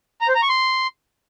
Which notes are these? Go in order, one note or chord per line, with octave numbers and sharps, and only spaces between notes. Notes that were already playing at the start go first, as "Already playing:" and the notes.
A#5
C5
A#5
C#6
C6